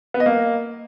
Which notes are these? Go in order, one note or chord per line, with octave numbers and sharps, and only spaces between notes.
B3
D#5
A#3